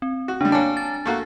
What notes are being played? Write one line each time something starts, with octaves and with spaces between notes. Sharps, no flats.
C4
F#4
C#3 G3 D4
A#3 C#4 D4 G#5 A5
A6
A3 A#3 F#4